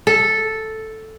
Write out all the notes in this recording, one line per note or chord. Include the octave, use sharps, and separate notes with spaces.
A4